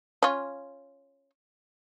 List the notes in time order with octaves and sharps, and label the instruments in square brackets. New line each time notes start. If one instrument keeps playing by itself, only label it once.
[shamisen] C#4 F4